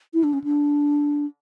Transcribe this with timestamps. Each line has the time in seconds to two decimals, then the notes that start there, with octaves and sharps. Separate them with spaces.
0.14 E4
0.24 D4
0.33 C#4
0.44 D4